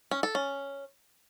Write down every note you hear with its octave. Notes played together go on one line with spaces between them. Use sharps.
C#4
A4
C#4